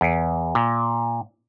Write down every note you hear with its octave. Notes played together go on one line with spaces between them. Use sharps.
E2
A#2